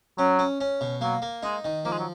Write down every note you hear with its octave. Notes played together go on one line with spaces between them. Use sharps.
F#3 C#4
C#4
C#4
B2
F#3 A#3
A#3
G#3 D#4
D#3
F3 A#3
G#3
F#3